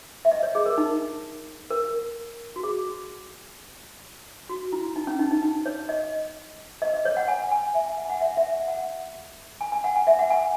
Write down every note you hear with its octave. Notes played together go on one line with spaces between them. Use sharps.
E5
D#5
C#5
G#4
A#4
D#4
A#4
F#4
G#4
F#4
E4
D#4
C#4
D#4
D#4
D#4
C#5
D#5
D#5
D#5
C#5
F#5
G#5
G#5
E5
G#5
F#5
G#5
F#5
E5
E5
F#5
F#5
G#5
G#5
F#5
G#5
E5
F#5
G#5